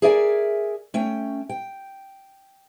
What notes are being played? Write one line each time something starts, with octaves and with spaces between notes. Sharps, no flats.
G#4 A#4 D5 E5 F5 G#5
A3 C#4 G5
G5